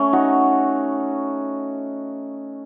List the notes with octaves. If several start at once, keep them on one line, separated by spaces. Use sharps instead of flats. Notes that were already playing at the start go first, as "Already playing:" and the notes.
Already playing: A3 C#4
D#4 F#4